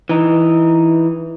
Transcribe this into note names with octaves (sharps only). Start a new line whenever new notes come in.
E3 D#4